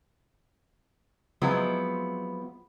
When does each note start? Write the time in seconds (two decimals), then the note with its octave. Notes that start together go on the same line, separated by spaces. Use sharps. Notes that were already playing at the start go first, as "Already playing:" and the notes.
1.42 F3 F#3 G#3 B3 C4 E4